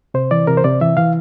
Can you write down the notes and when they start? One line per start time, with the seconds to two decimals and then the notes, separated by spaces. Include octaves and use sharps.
0.14 C3 C5
0.31 E3 D5
0.47 C3 A#4
0.57 C5
0.64 C3 D5
0.81 E3 E5
0.97 E3 F5